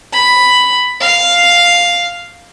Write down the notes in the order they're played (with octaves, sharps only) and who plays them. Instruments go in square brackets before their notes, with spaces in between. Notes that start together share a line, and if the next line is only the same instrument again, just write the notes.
[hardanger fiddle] B5
F5